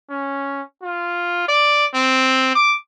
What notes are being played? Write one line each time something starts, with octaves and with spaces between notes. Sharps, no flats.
C#4
F4
D5
C4
D6